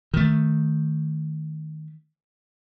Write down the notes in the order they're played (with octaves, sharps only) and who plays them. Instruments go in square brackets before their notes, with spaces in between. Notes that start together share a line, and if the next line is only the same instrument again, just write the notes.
[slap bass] D#3 A3